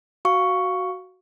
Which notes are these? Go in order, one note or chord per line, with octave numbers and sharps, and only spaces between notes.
F#4 F5 C#6